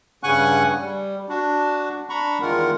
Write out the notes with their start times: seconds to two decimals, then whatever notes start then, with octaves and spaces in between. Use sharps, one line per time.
0.23 G2 C#3 F#5 G#5 C#6 F#6
0.79 G3
1.29 D4 F#4
2.10 D4 A#5 B5 C#6
2.41 E2 D#3 G#3 F4 A#4 F#5